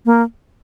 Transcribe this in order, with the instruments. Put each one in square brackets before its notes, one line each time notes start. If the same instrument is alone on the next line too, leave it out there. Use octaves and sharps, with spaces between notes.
[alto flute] A#3